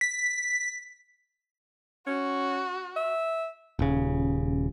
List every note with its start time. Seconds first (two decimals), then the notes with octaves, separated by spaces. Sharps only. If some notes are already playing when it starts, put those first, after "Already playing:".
0.01 B6
2.07 C#4 F#4
2.96 E5
3.79 D#1 C#3